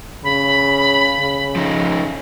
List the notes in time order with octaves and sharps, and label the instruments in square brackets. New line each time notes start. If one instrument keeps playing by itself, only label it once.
[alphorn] C#3 [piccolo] B5
[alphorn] C#3
[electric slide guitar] F3 D#4